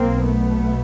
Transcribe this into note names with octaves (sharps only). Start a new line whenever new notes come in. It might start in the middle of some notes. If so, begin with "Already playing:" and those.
Already playing: B1 B2 A#3 C4
A3 B3